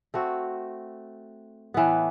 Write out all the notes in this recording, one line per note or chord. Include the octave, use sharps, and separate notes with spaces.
A3 C4 F#4
A2 E3 B3